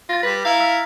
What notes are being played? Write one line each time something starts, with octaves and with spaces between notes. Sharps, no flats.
F4 A6 A#6
G3 B4
E4 F5 A#5
E6 F6 B6